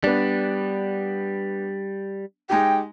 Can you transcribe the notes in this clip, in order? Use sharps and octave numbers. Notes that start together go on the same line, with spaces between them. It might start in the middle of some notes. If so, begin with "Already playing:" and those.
G3 B3 D4
G#3 D#4 G4 G5